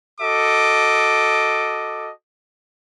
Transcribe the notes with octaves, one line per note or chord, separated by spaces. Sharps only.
F#4 A4 D#5 D6